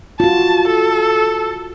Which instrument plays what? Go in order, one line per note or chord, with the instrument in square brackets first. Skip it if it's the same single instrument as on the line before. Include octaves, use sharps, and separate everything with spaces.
[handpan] F4 F#4 [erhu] A5
[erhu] A4